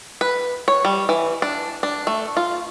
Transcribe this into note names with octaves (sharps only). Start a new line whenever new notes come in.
B4
C#5
G3
E3
D4
D4
A3
F4